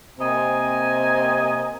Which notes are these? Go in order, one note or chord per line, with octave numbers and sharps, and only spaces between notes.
C3 A#3 C4 D#5 G#5 A#5